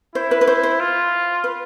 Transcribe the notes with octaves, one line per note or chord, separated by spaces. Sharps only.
E4 C5
B4
B4
C5
C5
F4
B4